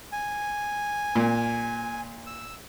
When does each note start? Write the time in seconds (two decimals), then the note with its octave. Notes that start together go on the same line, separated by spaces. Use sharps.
0.12 G#5
1.16 A#2
2.27 E6